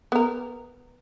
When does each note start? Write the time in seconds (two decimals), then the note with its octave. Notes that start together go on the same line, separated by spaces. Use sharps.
0.12 B3 A#4